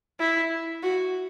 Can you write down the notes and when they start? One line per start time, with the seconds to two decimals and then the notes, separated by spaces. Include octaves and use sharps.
0.20 E4
0.83 F#4